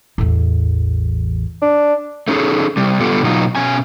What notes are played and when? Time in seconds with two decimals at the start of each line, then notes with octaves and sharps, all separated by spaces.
0.18 A1 E2
1.62 D4
2.28 A3 C#4 D#4 G#4 A4
2.77 C3 G3
3.01 D3 G3 B3 F4 G4 A4
3.23 B2 F#3 D#4 F4
3.55 B2 C#4 G#5